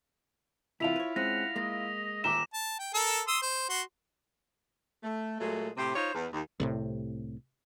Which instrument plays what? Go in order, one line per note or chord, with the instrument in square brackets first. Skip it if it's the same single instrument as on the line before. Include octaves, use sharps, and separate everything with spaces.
[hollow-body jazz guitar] C2 C3 E3 [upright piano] E4 F4 [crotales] B6 F7
[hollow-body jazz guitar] B4 C#5
[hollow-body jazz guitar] G#3 C4 C#4 [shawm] F#5 [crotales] A#6
[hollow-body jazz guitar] G#3 A#3 [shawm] D#5
[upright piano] D#1 A#5 G7 [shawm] E5 [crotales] D6 E7
[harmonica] A5
G5
A4 A#4 E6
C6 D#6 E6
C5
F#4 C6
[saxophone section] A3
A#2 F#3 G#3 A3
A2 C3 G4 C5
D#4 F4 C5 C#5
E2
D#2
[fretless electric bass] C2 A2 C3